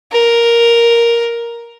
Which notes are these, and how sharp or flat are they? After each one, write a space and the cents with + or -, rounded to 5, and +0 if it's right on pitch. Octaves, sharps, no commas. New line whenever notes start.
A#4 +5